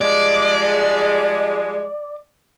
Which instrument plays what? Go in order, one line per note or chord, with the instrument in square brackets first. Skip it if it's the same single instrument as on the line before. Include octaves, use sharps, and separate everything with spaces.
[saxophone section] F3 G3 G#3 [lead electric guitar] D5